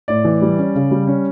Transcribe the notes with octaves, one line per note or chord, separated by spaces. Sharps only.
A2 D5
E3
G3
C#4
C#3
G3
C#4